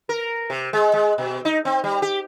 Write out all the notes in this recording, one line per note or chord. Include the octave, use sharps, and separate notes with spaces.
A#4
C3
G#3
G#3
B2
D#4
C4
G3
G4